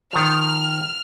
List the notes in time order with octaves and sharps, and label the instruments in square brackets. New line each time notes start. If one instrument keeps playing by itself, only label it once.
[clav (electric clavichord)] D#3 F3 [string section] F6